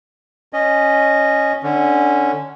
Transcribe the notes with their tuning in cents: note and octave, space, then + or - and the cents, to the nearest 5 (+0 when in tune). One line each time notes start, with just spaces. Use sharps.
C#4 +0 D#5 -15
D3 +15 C#4 +0